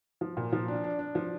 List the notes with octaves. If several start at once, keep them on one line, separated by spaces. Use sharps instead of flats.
F3
A#2
F3
D4
D4
D4
F3